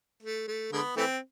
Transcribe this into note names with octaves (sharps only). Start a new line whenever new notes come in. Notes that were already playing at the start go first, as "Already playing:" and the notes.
A3
A3
D3 G#3 B3
E3 A3 C4